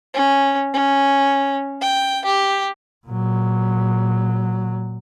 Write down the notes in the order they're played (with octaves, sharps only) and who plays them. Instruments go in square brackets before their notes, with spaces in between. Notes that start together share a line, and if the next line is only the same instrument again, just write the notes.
[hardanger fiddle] C#4
C#4
G5
G4
[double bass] A#2 F#3